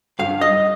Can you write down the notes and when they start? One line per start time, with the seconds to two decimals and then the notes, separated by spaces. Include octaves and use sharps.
0.19 G2 F5
0.41 D#5